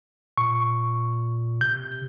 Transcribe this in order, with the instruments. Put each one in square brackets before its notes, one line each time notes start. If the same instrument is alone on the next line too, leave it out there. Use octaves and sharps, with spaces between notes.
[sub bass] A#2 [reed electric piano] C#6
[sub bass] C3 [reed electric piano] G6